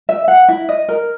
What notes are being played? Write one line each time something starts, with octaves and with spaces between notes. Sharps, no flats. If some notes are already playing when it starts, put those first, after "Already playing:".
E5
F#5
E4
D#5
A#4